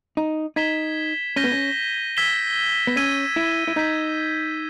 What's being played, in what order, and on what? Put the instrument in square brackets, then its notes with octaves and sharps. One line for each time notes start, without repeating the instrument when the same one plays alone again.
[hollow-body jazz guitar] D#4
[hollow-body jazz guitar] D#4 [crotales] G#6 B6 E7 G7
[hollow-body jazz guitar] C#4 [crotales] G6 A#6 D#7 G7
[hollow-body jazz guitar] B3
C#4
[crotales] E6 G#6 B6 E7 G7
[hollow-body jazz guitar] B3
[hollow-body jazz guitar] C#4 [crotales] E6 G#6 D#7 G7
[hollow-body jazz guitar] E4
E4
[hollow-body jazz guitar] D#4 [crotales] G6 B6 D#7